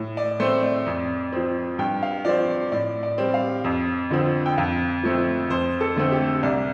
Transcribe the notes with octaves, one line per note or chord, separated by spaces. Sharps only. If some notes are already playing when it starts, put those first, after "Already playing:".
Already playing: A2
D5
A3 C4 C5
D5
F2
F3 C4
G2 G5
F5
F3 C4 D5
A2 D5
D5
G3 C4
F5
F2
D3 F3 C4
G5
F2 F5
F3 A3 C4
F2 C5
A4
D3 A3 C4
G4
C2 D5